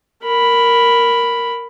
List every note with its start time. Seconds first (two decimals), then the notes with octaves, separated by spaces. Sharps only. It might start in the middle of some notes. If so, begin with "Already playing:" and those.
0.23 A#4 B5